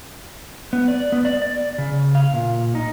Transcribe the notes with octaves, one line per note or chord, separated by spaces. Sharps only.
B3
D5
B3
D5
D5
C#3
F5
A#2
D#4